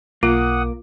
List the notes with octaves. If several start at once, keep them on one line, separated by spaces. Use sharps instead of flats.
B1 A#3 F4 F#5 D6 D#6